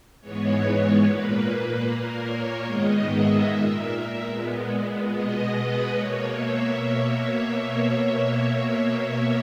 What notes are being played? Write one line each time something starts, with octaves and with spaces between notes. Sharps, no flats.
G#2 E3 G#3 B3 C#5
A#2 A#3 B4
B4
A#2 A#3 A#4
C#5
G#2 D#3 G#3 B3 D#5
E5
A#2 A#3 E5
A#2 G#3 B3
B2 G#3 B3 D#5
B4
B2 A#3 C#5
E5